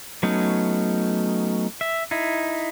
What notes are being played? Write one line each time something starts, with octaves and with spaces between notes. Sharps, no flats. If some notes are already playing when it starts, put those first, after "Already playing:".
F#3 A3 B3 C#4 D#4
E5
D#4 E4